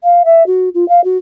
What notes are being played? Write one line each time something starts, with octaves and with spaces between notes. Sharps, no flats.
F5
E5
F#4
F4
F5
F#4